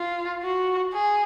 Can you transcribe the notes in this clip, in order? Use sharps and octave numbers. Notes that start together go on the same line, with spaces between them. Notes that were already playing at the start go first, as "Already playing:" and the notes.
Already playing: F4
F#4
G#4